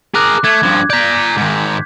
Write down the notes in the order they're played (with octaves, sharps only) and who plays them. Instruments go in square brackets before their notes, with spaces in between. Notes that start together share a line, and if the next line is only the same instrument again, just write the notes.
[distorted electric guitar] G#4 A#4 [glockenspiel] D6 F#6
[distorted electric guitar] A3 [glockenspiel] G#6
[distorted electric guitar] G2 F3
[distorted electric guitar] D5 A#5 [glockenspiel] G6 B6
[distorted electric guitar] G#2 D#3